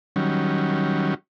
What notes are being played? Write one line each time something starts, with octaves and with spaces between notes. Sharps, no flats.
D#3 F#3 G3 C#4